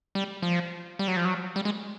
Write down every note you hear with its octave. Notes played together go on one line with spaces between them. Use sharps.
G3
F3
G3
F#3
F3
F#3
G3
G#3